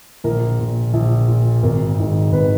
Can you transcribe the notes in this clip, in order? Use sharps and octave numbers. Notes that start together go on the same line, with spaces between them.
A#1 A#4
A#2
A#1
A#2
G#1 A#4
G#2 D#3
G#1 B4